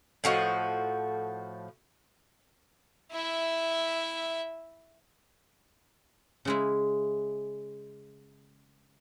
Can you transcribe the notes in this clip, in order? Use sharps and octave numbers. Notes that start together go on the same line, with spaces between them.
A2 F3 F#4 D#5
E4 E5
C#3 G#3 E4